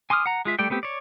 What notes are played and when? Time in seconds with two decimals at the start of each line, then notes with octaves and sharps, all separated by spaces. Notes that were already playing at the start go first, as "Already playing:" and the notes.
0.10 G#5 C6 D6 D#6 F6
0.26 F#5 A#5
0.45 G#3 F4 E5
0.59 G3 A3 D5 G5
0.70 A3 B3 C4 G4
0.83 C#5 D5